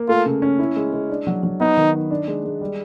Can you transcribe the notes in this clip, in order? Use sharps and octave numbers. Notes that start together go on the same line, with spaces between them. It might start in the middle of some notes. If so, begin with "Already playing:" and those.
Already playing: A#3
A3 F4
C#3
C#4
E4
G#3
G#3
D4
F#3
F#3
B3 D#4
D#3
D#4
D4
G#3
G#3
G3